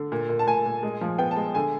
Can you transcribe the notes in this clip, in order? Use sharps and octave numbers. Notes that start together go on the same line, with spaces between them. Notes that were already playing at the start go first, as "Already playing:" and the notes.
Already playing: D3
A#2
A#2
A5
A#2 G#5
A#2
G#3
F3
B3 G5
A5
G#3
D3 G#5